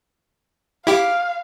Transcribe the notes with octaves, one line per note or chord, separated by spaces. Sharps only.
E4 G4 F5 D6